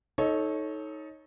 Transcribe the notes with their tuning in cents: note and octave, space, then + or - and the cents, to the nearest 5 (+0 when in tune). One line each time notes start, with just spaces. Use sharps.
D#4 +15 A4 -15 C#5 -10